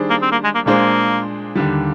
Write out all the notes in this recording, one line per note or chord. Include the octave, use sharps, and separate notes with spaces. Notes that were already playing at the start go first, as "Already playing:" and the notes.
Already playing: D#3 G3 D4 G#4 C5
A#3
C4
A#3
G#3
A#3
A#2 G#3 A#3 D4 G#4 C5
D#2 D3 G3